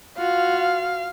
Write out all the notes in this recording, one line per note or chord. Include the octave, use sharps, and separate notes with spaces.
F4 F#4 F5